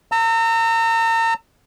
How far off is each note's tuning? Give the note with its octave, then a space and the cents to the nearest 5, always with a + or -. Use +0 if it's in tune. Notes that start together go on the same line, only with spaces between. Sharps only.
A#5 -35 E6 +0